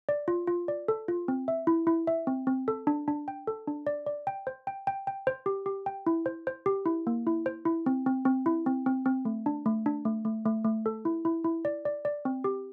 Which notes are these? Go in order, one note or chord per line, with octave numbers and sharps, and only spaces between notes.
D5
F4
F4
D5
A4
F4
C4
E5
E4
E4
E5
C4
C4
A4
D4
D4
G5
A4
D4
D5
D5
G5
C5
G5
G5
G5
C5
G4
G4
G5
E4
C5
C5
G4
E4
A#3
E4
C5
E4
C4
C4
C4
E4
C4
C4
C4
A3
D4
A3
D4
A3
A3
A3
A3
A4
E4
E4
E4
D5
D5
D5
C4
G4